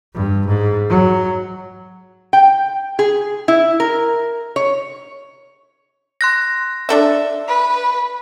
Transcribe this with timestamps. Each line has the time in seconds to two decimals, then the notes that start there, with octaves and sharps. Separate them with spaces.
0.14 G2
0.47 G#2
0.89 F#3
2.33 G5
2.99 G#4
3.48 E4
3.80 A#4
4.56 C#5
6.21 C6 F#6 A#6
6.89 D4 A4 E5
7.48 B4